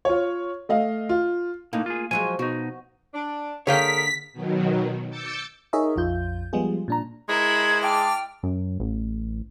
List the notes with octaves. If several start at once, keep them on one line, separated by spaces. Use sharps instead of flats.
F4 C#5
A3 D#5 F5
F4
A2 A#3 D#4
F4 G#4
F3 F#3 G#3 G#5
B2 D#4 F#4
D4
D3 A#3 G#4 C#5 F5 G5 B6
B2 D#3 F#3
D6 E6 G6 A6 C#7
D#4 G#4 A#4 C#5 D#5 E5
A#1 F2 F4 G6
F3 G3 G#3 B3 F4 G#4
A#2 D4 A#5
G#3 E4 A#4 G#6
E5 G5 A5 D6 F6
F#2
A1